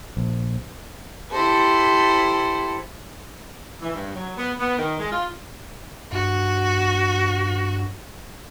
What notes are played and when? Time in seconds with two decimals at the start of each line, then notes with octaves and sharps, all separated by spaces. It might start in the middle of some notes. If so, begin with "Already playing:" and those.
0.17 A#1
1.31 E4 G4 A4 C5
3.82 E3
3.94 G2
4.15 F#3
4.37 B3
4.60 B3
4.78 D#3
5.00 G#3
5.12 F4
6.12 G2 F#4